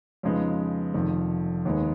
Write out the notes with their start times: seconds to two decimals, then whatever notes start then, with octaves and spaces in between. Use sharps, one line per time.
0.23 F2 C#3 G#3 B3 D#4
0.94 F1 F2 D#3
1.65 D#2 D#3 G#3 B3 D#4